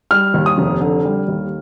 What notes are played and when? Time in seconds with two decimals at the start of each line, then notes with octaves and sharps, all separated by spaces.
0.11 G3 F6
0.34 D#2
0.46 D#6
0.58 F1
0.81 D3
1.05 G3
1.28 D#2